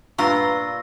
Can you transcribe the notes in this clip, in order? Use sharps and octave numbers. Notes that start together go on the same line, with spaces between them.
G2 A#2 F4 B4 A#5 C#6 E6 A#6